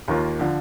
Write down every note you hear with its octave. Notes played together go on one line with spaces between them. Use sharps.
D#2 D#3 A#3 F4 A#4
D3 F3